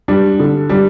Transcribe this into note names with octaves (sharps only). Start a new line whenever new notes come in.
G3 D4
D3
G3 D4